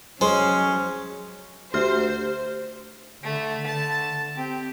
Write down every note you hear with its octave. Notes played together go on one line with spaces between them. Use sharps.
F#3 G#3 C#4 C5
D2 G4 C5 F6
D3 A3
D3 A5
C4 G4